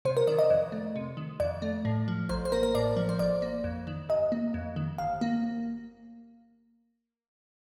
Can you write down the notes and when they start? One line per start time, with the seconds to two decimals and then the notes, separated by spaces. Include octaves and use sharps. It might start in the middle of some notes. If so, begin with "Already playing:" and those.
0.05 C3 C5
0.17 A#4
0.27 D#3 D5
0.39 D#5
0.50 F2
0.72 A3
0.96 C3
1.17 D#3
1.40 F2 D5
1.62 A3
1.85 A2
2.08 F3
2.29 A1 C5
2.45 C5
2.52 A#3 A#4
2.63 A#4
2.75 A2 D5
2.97 F3
3.09 C5
3.19 A1 D5
3.42 A#3
3.64 F2
3.87 D#3
4.09 G1 D#5
4.32 A#3
4.54 F2
4.76 D#3
4.98 G1 F5
5.21 A#3